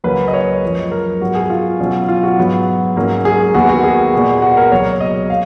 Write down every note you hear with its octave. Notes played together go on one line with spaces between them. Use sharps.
C#2 C#3 F#3 A#3 C#4 B4
D#5
C#5
F#2 F3 G#3
A#4
G#2 F#3 B3 F#4
G#4
F4
B2 F#3 C#4
F4
F#4
G#2 F#3 B3
G#2 F#3 A#3 C#4
G#4
D#2 D#3 G#3 B3 F#4
F#4
G#4
A#2 G#3 B3
F#4
A#4
C#2 B2 F#3 A#3 C#5
D#5
F5